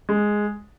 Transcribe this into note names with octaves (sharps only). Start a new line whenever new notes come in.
G#3